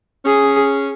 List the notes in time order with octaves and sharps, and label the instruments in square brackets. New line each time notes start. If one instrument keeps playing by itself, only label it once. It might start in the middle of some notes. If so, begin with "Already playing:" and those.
[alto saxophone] C#4 [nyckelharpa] G#4